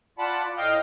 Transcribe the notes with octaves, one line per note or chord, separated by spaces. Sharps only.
F4 D5 F#5 A5 B5
A2 D#5 F5 G5 F6 G6